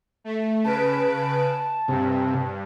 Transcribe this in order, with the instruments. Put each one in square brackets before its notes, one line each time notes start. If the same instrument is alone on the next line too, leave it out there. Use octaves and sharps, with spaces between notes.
[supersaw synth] A3
[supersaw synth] C#3 B4 D7 [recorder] A5
[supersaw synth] G2 [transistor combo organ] C3